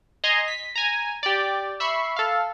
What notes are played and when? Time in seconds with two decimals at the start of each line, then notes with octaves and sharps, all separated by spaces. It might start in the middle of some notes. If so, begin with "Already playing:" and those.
0.24 D#5 G#5 A#5 C6
0.48 B6
0.76 G#5 A#5
1.23 G4 D5
1.80 E5 B5 C#6 C7
2.16 A4 F5